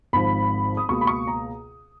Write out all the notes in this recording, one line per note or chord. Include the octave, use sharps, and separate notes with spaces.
G#1 G#2 F3 B5
D#6
C#2 B2 A#3 C#6
B5
C#6
A#5